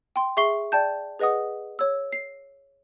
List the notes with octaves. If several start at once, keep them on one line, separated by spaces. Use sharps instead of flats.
G5 C6
G#4 E5 C#6 C7 G7
D5 G5 A5 G6
G#4 B4 D#5 F#5 D#6
C#5 E6
C7